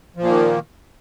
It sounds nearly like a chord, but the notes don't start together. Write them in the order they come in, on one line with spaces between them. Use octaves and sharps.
F3 A#2 A#3 D#3